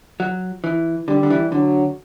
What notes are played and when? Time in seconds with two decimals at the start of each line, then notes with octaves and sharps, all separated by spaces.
0.20 F#3
0.64 E3
1.08 D3 G3
1.23 D3
1.30 E3
1.52 D3 F#3